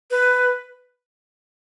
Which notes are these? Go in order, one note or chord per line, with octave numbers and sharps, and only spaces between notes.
B4